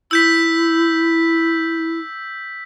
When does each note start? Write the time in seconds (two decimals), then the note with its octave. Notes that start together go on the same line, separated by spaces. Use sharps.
0.11 E4 E6 G6 B6